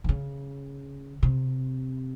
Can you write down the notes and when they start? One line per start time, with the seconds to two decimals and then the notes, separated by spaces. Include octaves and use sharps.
0.04 D#3
0.09 C#3
1.23 C3